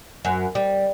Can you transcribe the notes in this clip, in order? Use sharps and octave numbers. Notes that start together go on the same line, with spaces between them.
F#2
G3